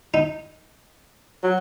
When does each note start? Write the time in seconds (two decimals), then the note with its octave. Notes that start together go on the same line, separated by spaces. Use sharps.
0.14 D#4
1.43 F#3